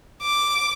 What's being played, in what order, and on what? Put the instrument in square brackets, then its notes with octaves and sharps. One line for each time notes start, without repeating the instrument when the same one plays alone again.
[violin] D6